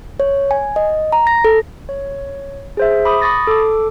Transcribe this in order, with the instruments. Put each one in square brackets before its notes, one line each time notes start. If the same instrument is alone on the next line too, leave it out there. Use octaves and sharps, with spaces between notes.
[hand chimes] C#5
G#5
D#5
A#5
A#6
A4
[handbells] C#5
G#4 C5 E5
B5 D6 D#6
B5 C#6 D#6 A6 A#6
A4 D6